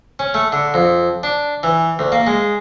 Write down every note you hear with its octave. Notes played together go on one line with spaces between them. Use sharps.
C#4
A3
D3
F2
D4
E3
D2
A#3
G#3